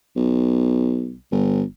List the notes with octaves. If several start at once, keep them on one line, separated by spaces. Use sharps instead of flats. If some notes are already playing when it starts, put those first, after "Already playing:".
B1
G1